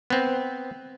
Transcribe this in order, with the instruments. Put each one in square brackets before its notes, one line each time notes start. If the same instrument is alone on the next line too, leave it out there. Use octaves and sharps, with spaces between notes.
[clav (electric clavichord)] B3 C4